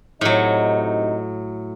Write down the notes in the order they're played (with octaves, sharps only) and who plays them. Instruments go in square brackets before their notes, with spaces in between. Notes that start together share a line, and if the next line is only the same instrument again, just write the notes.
[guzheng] A2 F#3 [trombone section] C3 D#4